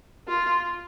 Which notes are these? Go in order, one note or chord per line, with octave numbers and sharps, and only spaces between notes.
F4